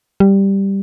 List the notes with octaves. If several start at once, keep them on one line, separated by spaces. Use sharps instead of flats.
G3